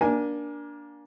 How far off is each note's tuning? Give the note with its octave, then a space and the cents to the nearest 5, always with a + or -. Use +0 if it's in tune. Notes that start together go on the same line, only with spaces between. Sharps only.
A#3 +25 D4 -5 G#5 +0